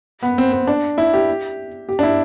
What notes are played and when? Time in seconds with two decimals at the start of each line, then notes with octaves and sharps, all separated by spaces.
0.23 B3
0.38 C4
0.53 C4
0.67 D4
0.98 E4
1.13 G4
1.89 G4
1.99 D4
2.03 E4